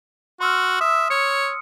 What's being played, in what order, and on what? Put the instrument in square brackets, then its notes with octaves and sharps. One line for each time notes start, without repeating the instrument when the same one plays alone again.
[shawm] F#4 [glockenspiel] C6 E6 F6
[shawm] E5 [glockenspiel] D#6
[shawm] C#5 [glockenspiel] C#7